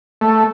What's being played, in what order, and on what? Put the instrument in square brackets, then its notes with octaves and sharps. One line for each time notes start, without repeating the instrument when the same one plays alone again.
[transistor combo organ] A3